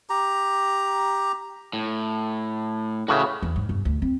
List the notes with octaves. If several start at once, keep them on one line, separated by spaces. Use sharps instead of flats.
G4 A#5
A2
A2 C#3 E3 F#4 E5
E2
G#2
G1
D2
C4